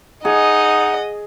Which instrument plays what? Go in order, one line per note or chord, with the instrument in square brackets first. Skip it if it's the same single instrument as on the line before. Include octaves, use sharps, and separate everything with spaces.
[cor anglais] D#4 [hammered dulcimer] G#4 [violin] D#5 [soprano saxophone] F#5